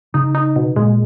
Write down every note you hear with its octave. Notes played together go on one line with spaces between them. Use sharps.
C#3 D#4
D#4
B2
A#2 G#3